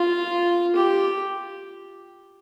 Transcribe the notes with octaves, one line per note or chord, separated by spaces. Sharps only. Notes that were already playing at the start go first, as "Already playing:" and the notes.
Already playing: F4
G4